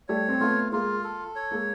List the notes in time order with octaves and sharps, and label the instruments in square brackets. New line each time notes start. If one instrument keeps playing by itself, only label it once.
[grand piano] G3 A3 [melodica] C#5
[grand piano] C4
[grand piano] A3 B3 [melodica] F4
[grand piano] G#3 A#3 [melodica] F4
[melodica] A4
C#5
[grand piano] G#3 A#3